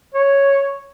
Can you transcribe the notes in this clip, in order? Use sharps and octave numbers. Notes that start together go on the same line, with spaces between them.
C#5